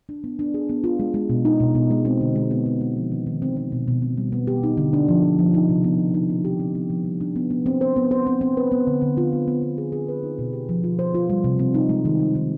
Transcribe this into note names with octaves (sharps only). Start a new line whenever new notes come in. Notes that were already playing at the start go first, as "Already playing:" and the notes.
D4
B3
D4
G#4
B3
F4
G#3
G#3
B2
D#4
B2
B2
G#3
C4
D3
G#3
B3
G#3
G#3
F3
D#3
D#3
C4
C4
B2
B2
C4
G3
B3
G4
D#4
D3
D4
F3
F3
F3
D#4
C3
B3
B3
D#4
C4
G4
C4
B3
F3
G3
D4
B3
B3
C4
C5
B3
C5
C4
C4
B4
B3
D3
D3
F4
B3
B3
B3
G#4
G#4
B4
D#4
B2
G4
F3
F4
C5
F4
G3
C3
C4
D#4
G#3
D#3
G3
D#3